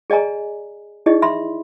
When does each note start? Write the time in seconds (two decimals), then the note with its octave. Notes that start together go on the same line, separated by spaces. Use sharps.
0.10 G#4 D5 D#5 G#5 A#5
1.06 D#4 E4 G4 G#4 D5 D#5
1.22 E5 B5 C6